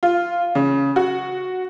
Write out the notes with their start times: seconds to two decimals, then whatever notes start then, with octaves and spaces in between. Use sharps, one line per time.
0.03 F4
0.55 C#3
0.96 F#4